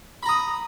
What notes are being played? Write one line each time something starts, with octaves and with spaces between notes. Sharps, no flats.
A#5 B5 D#6